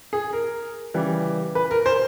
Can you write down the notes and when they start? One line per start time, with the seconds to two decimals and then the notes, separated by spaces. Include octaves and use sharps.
0.13 G#4
0.33 A#4
0.94 C#3 E3 G3
1.55 B4
1.71 A#4
1.86 C5